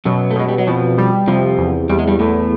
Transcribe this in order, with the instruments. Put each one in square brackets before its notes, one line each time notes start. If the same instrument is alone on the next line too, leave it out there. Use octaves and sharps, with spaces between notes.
[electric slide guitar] F#2 F#3 [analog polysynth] B2
[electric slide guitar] A3
[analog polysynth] B2 [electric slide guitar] G#3
[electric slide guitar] G3
F#3
[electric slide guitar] F2 F3 [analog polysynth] B2
[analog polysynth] G3
[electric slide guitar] F2 F3 [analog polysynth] C3
[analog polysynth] E2
[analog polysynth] E2 [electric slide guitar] G3
[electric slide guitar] G#3
G2 G3
[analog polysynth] E2 [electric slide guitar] A2 A3